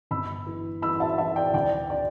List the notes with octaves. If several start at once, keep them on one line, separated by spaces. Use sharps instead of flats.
G1 B5 E6
E3
E3 B5 E6
E5 A5
E3 E5 A5
D5 G5
D2 D5 G5
D5